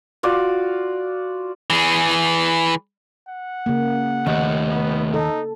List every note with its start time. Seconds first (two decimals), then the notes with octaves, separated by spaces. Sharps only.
0.23 F4 F#4 D5
1.70 E3 G#4
3.28 F#5
3.66 C#3 A#3
4.27 D#2 C3 A3 G4
4.70 B3
5.14 D#4 A4